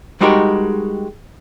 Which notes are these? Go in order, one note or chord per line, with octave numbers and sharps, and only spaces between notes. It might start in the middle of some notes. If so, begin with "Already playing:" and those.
G3 G#3 D#4 F#4 G4 A#4